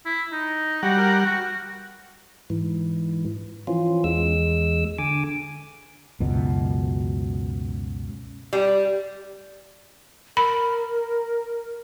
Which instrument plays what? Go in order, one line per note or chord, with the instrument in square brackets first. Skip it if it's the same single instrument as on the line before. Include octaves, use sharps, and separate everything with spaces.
[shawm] E4
D#4
[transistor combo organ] G3 F#5 [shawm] F#4
[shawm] A#4
F#4
[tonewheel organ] G#2 E3
E3 F3 C#4 F4
E2 G#3 E6
D3 G#5 D6
[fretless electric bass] C#2 F#2 B2
[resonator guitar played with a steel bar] G3
[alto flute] A#4 [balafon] B5